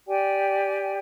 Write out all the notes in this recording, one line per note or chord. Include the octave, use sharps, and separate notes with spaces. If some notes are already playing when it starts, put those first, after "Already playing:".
G4 D5 G5 G#5